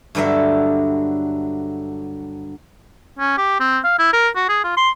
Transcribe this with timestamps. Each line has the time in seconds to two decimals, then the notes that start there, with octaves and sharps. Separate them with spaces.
0.15 G2 D3 F#3 A4 E5
3.19 C#4
3.37 G4
3.60 C4
3.84 F5
3.99 E4
4.13 A#4
4.36 F#4
4.49 G#4
4.64 F4
4.77 C6